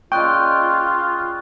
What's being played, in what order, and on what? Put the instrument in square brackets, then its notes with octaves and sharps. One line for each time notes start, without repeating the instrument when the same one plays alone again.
[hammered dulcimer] C#3 D5 D#5 [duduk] F4 [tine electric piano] G5 [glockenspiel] C#6 F#6